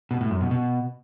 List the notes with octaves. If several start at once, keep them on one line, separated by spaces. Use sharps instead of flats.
B2
A2
F#2
B2
B2